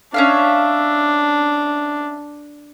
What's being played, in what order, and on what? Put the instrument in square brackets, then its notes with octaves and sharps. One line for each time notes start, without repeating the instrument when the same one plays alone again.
[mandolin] C#4 E5 F5 [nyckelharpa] D4